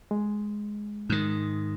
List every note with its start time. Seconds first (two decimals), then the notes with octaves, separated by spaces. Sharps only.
0.11 G#3
1.09 G#2 D#3